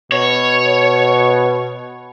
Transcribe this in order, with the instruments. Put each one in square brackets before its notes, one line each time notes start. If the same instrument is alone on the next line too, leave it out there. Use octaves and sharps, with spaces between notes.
[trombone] B2 [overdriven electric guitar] C#5